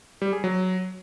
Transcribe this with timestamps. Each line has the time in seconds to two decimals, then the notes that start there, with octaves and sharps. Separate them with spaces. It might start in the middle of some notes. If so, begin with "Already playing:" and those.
0.22 G3
0.33 G#4
0.44 F#3